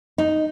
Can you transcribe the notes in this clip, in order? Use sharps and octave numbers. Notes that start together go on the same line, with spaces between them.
D#4